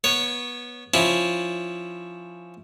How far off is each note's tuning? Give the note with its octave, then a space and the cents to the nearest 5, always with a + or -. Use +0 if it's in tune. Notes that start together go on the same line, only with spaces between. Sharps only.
B3 -20 C#5 +0
F3 +0 C#4 +0 E4 +0